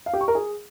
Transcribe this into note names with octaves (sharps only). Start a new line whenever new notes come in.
F5
G4
C#6
A#4
G#4